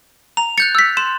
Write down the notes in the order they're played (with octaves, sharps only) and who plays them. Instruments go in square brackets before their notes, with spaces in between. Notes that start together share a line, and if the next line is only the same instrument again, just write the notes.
[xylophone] A#5 [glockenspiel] F7
[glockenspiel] F#6 G6 A6 [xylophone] C#7
[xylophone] E6 B6
[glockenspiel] C6 [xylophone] E7